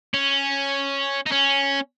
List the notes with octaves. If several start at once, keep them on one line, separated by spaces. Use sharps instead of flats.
C#4
D#4
C#4